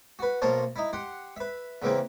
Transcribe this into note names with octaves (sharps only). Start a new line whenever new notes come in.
F#4 B4
B1 A#3 A#4 C5 C#5 A5
D#4 E4
G4 F#5 C6
B4 E5
E2 C#3 E3 A#3 C4